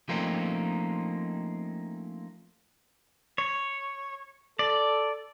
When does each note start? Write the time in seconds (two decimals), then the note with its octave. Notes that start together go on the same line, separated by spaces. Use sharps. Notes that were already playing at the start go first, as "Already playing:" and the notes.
0.09 F3 A3 A#3 C4 C#4 D#4
3.38 C#5
4.59 A4 D5